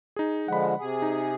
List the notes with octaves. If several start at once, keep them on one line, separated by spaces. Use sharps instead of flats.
D#4 G#4
D3 F3 G#3 F#5 B5
C3 G#4
D#4